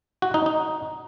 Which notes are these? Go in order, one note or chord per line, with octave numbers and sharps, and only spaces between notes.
F#4
D#4
D#4